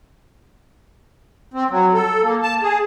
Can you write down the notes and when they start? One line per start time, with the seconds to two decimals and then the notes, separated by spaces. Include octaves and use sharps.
1.54 C4
1.70 F#3
1.93 A4
2.23 A#3
2.43 A5
2.62 G#4